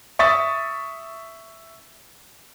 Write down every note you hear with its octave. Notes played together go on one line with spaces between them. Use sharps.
E5 C#6 D#6 A6 B6